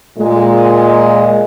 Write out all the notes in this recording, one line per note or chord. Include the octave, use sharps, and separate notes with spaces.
A#2 G#3